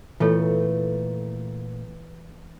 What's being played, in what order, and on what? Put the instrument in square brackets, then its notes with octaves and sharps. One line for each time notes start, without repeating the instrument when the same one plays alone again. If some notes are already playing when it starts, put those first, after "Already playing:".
[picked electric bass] A#2 A3 [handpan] E3 [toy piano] F4 A4 C#5